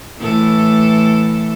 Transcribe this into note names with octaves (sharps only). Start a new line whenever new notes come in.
A2 E3 A4